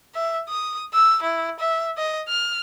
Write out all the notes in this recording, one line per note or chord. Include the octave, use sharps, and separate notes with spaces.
E5
D#6
E6
E4
E5
D#5
F6